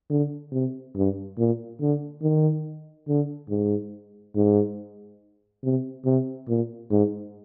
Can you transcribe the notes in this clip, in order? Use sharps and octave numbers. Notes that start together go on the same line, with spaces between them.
D3
C3
G2
A#2
D3
D#3
D3
G#2
G#2
C3
C3
A#2
G#2